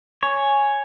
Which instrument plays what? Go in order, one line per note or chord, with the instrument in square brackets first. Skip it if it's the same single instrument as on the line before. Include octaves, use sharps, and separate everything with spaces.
[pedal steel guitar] C#5 [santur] G#5